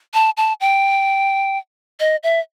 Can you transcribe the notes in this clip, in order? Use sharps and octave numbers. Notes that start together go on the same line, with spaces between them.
A5
A5
G5
D#5
E5